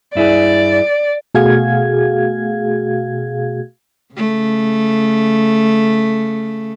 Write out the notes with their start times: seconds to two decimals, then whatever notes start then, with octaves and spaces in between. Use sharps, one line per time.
0.15 G2 E4 G#4 D5
1.34 B2 A3 F#4 G#4 F5 G#6
4.15 C#3 A3